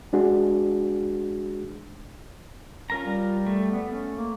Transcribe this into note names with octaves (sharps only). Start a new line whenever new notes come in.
G#3 D4 F#4 G#4
C#4 F4 A#4 A#5
G3
A3
B3
C#4
A#3